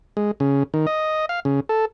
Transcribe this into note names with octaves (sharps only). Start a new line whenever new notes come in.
G#3
C#3
D#3
D#5
F5
C#3
A4